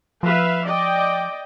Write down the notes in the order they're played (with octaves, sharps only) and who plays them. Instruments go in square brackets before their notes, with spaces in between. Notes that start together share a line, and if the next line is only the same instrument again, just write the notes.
[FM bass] F3 [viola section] B4 E5 F5
[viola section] D5 D#5 G5